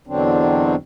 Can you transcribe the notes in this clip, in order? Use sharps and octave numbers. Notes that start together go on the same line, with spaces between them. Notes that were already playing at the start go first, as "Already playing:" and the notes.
E2 B2 D3 F#3 C4 D4